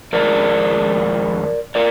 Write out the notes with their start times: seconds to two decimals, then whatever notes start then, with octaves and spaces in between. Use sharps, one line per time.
0.13 F2 D#3 G#3 A#4 D5
1.75 A#4 D5